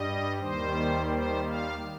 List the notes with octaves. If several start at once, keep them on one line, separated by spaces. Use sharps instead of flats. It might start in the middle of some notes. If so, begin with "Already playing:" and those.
Already playing: G2 G3 D#5
D#2 D#3 G3 C5
C5
F5